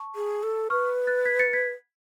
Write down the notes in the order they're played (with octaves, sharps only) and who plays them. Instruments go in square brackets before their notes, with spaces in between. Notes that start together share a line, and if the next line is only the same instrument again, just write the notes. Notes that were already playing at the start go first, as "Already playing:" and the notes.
Already playing: [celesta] A5 C#6
[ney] G#4
A4
[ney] B4 [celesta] C#6 F6
[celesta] F#6 A6
G#6 B6
A6 C#7
G#6 B6